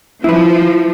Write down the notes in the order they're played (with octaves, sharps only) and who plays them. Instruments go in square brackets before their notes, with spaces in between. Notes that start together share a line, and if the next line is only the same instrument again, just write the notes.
[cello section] F3 [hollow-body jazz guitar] E4 B4